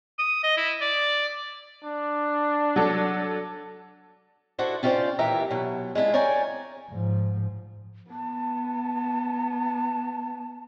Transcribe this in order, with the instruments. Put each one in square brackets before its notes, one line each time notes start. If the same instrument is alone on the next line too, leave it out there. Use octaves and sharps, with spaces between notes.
[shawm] D#6
D#5
E4
D5
[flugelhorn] D4
[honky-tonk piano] F#3 A4
[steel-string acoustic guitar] D4 E4 F#4 A4 C5
C#4 F4 G4 A4 C5 D5
D#2 A#2 E3 G4 E5 A#5
B2 F#3
G#3 D4 E4 F4
A#4 C#5 D5 G5 G#5
[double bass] G#2 F3
[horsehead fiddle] B3 [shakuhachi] A5